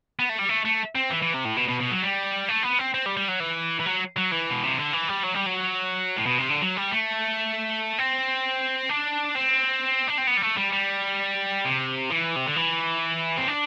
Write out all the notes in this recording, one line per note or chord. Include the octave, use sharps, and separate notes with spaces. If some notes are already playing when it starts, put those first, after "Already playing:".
B3
A3
G3
A3
A3
C4
E3
E3
C3
A2
B2
B2
B2
F#3
G3
A3
B3
C4
C4
G3
G3
F#3
E3
E3
F#3
F#3
E3
B2
C3
D3
E3
G3
F#3
G3
F#3
A2
B2
C3
D3
F#3
G3
A3
C4
D4
C4
D4
C4
B3
G3
A3
G3
G3
C3
E3
C3
D3
E3
C4
D4